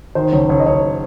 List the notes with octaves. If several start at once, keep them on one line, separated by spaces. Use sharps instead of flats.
D#3 C5
F#1 C#5
F#1 C#5
D#5
F#1 C#5